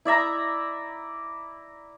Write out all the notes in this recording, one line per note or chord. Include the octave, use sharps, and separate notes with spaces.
E4 D5 E5 A#5